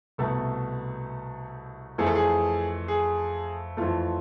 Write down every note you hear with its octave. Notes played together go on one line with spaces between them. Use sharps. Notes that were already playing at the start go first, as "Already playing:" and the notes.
C2 B2 A3 A4
F2 E3 A3 G#4
A4
G#4
G#4
F2 E3 A3 F4